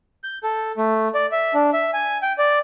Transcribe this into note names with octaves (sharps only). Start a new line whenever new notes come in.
G6
A4
A3
D5
E5
D4
E5
G#5
G5
D5